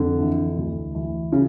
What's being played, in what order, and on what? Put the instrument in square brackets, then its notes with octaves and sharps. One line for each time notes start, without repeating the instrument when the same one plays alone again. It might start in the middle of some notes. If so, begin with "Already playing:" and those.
Already playing: [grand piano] F2 [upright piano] D3
[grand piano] E3
D2
E3
[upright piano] C#3